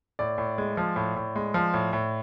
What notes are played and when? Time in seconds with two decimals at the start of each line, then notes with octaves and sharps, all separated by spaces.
0.19 A2 D5
0.38 A2
0.58 G#3
0.77 F3
0.96 A2
1.16 A2
1.36 G#3
1.54 F3
1.74 A2
1.93 A2